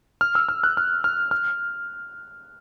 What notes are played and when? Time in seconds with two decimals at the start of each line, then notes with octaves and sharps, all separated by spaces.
0.21 F6
0.35 E6
0.49 F6
0.64 F#6
0.77 F6
1.04 F6
1.31 F6